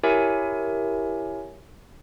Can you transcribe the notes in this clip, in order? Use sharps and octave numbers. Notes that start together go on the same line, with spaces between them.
E4 G4 A#4 C#5 E5 G#5